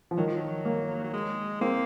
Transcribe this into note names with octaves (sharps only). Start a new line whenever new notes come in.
F3
D#3 F#3
F3
F#3
A#3
F#3
G#3
A#3 C4